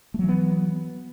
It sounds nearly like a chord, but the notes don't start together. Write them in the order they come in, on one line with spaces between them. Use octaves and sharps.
A3 F#3 E3 B3